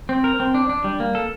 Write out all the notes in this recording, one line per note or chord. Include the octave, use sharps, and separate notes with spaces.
C4
A#4
C4
D4
D4
G3
A#3
A4